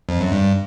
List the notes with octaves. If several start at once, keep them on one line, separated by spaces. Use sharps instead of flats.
F2
F#2
G2